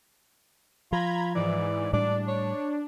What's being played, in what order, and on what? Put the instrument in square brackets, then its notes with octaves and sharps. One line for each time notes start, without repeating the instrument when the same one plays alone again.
[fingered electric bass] F3 [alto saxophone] F4 [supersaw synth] A#5 B5 G#6
[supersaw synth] G#2 E3 [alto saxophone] D5
[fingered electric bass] A2 G3 [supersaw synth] D4 [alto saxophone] D5
[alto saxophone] C#5